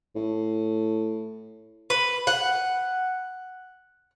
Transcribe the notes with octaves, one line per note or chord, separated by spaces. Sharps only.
A2
B4
F#5